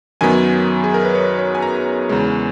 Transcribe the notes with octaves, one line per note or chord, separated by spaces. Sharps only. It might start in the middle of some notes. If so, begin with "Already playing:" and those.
F#2 D#3 F#3 B3 G#5
G#4
A#4
B4
C#5
C#5
G#5
A#5
E2 C#3 G#3